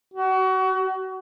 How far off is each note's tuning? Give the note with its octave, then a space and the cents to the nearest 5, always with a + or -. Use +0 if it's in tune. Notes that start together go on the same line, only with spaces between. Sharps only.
F#4 +30